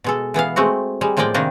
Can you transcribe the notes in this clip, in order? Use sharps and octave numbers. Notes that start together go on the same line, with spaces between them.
B2 G#3 A4
E3 B3 G#4 F5
G#3 A3 C4 F#4
G3 G#3
A2 F3 G#3 A#3 D5 G5
C3 D#3 G3 A#3 D4 D#4